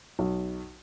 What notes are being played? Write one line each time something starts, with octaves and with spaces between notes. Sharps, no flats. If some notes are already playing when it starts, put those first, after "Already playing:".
B1